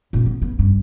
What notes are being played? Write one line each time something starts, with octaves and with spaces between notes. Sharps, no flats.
A#2 A#3
B3
B3
G2